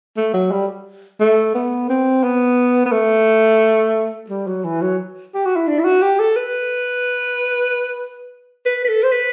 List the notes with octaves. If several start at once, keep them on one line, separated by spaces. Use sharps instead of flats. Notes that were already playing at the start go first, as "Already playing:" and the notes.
A3
F#3
G3
A3
B3
C4
B3
B3
A3
G3
F#3
E3
F#3
G4
F#4
E4
D4
E4
F#4
G4
A4
B4
B4
B4
A4
C5
B4